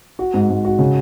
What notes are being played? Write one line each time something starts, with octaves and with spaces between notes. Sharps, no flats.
F#4
G#2
G#2
F#4
C#3